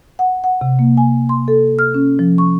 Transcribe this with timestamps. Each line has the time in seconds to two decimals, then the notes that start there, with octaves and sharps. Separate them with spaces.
0.19 F#5
0.44 F#5
0.61 C3
0.79 A#3
0.97 G#5
1.29 C6
1.48 A4
1.79 F6
1.94 C#4
2.19 F3
2.38 C#6